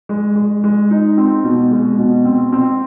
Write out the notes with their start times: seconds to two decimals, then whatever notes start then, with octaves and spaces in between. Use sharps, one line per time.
0.09 G#3
0.36 G#3
0.64 G#3
0.91 D#4
1.17 C4
1.44 B2
1.71 G#3
1.99 B2
2.25 C4
2.52 C4